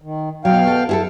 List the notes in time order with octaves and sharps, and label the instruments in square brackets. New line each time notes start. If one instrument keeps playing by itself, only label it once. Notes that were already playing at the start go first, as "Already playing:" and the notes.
[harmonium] D#3
[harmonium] B2 F5 G5 [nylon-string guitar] F#3
[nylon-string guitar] A4
E4 G#4 A4